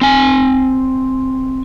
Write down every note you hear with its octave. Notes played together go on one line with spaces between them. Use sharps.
C4 G#5